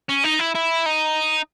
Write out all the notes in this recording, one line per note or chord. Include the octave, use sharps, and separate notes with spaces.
C#4
D#4
E4
E4
D#4